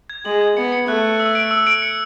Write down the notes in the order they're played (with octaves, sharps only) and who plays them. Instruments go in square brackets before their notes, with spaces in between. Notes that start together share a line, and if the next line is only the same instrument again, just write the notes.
[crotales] G#6
[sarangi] G#3 [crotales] F#7
[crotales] G#6
[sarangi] B3 [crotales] C#7
[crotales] C#7
[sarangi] A3 [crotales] F#6
[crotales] F#6
E6
D7
E6
D7
C#7